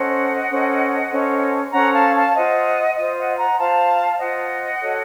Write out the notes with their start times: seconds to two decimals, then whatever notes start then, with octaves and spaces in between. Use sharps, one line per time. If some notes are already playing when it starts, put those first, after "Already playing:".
Already playing: C#4 A4 C5 D#5 F#5
0.50 C#4 A4 C5
1.11 C#4 A4 C5
1.73 C#4 A4 C5 F#5 A#5
1.93 F5 A5
2.15 F5 A5
2.34 F4 C5 D#5 F#5
2.96 F4 C5 D#5
3.17 D#5 F#5
3.37 F#5 A#5
3.58 F4 C5 F5 A5
4.19 F4 C5 D#5 F#5
4.81 F#4 A4 C#5